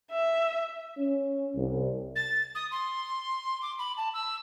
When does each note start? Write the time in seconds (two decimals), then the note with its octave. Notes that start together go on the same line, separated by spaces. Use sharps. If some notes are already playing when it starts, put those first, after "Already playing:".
0.12 E5
0.98 C#4
1.55 C2
2.16 A6
2.55 D#6
2.71 C6
3.62 D6
3.79 B5
3.97 A5
4.14 E6